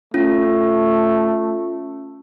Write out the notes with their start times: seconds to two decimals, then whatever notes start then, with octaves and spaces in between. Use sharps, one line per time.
0.14 A3 C#4 F4